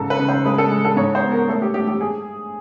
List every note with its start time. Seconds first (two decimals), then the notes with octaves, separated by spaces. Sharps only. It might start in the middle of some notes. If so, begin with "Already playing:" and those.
Already playing: G#2 C#3 A4
0.10 B4
0.19 C#3
0.29 C5
0.45 G#3 B4
0.58 A4
0.71 G#3
0.85 A4
0.96 G#2 C#5
1.15 C5
1.22 B3
1.32 A#4
1.48 A3 A4
1.62 G4
1.74 A3 G4
1.88 G4
2.01 G#4